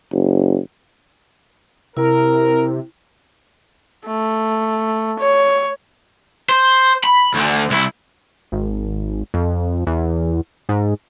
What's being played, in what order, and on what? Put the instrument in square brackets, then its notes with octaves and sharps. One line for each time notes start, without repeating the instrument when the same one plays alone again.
[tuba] F#1
[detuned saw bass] C3 [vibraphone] E4 [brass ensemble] A#4
[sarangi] A3
C#5
[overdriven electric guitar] C5
B5
D2 D3
C2 E4
[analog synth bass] G#1
F2
E2
G#2